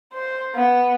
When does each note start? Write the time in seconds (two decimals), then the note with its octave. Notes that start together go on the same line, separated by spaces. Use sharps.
0.13 C5
0.55 B3